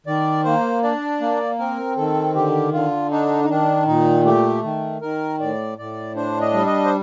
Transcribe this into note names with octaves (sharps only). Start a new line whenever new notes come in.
D#3 D5
A#3 C5
D4 D5
A#3
C4 A#4
D#3 A4
D3 G4
D3 F4
D4 D#4
D#4
D#3 D4
A#2 D#4
A3 G4
D#3
D#3 A#4
A2 D5
A2 D5
D4 C5
D#5
G3
D#5
C5